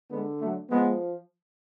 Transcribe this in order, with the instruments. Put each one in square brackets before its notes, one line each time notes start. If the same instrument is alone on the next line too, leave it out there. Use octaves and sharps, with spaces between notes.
[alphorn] D3 [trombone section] G#3 B3
[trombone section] F#3 A3
[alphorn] F3 [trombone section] G#3 B3